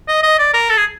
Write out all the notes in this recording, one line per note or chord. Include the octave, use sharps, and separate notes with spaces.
D#5
D#5
D5
A#4
A4
G#4